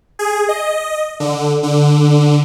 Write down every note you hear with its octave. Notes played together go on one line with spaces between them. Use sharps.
G#4
D#5
D3
D3